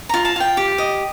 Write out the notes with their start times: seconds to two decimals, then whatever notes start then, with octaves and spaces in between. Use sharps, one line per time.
0.09 F4 A#5
0.25 A5
0.36 F4 G5
0.57 G4
0.78 D#5